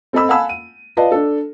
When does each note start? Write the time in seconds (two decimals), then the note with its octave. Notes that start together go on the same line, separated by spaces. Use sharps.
0.13 C4 A4 D#5 B5 E6
0.29 F5 F#5 G#5 A5 B5 E6
0.49 D#7
0.97 F4 B4 D5 D#5 F5 A5
1.12 D4 A4